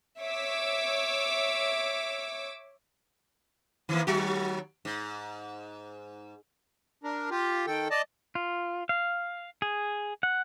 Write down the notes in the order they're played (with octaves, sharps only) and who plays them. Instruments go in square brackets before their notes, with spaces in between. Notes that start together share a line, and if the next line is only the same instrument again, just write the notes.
[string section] C#5 E5 D6 E6
[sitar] D#3 E3 A#3
D#2 F#3 F#4
G#2
[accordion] D4 A#4
F4 G4
D#3 A4 G5
D5 D#5 A5
[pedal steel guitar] F4
F5
G#4
F#5